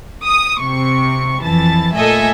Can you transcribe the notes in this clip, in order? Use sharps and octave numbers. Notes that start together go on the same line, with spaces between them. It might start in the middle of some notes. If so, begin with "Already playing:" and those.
D#6
C3 C#6
F2 E3 A5 A6
A#2 A3 A4 D#5 E5 G#5